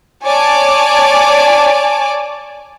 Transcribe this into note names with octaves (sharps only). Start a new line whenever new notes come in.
C#5 D5 G#5 A5 D6